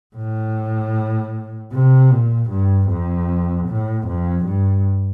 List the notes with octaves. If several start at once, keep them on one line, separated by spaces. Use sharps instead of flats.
A2
C3
A#2
G2
F2
A2
F2
G2